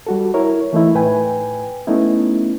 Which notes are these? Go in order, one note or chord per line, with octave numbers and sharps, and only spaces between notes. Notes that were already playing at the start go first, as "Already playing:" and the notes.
G3 F#4 A4
E4 A#4 C#5
E3 A3 D#4 E4
A2 B4 G5 G#5
A3 B3 C#4 D#4 E4